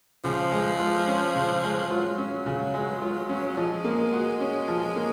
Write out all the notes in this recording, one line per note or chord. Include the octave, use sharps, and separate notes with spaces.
C#3 F3
G#3
F4
C#4
C#3
G#3
F#3 F4
C#4
C#3
G#3
F4
C#4
F3 G#3
A#3
F#4
C#4
F3
A#3